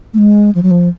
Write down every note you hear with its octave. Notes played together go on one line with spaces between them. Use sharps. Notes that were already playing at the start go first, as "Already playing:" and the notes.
A3
G#3
F3
F#3
F3